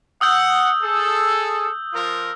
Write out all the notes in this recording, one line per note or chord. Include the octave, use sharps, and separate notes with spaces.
F#5 D#6 E6 G6
G#4 A4
F3 F4 A#4